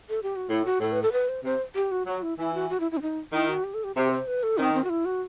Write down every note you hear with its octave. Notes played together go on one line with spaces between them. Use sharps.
A4
G4
F#4
A2 E4
F#4
A2 A4
B4
A4
B4
C5
C3 C5
G4
F#4
F#3 F#4
E4
E3 E4
F#4
F#4
E4
E4
C4
D#4
D#3 E4
F#4
G4
A4
G4
C3 G4
C5
B4
A4
D#3 C4
C4
F#4
E4
F#4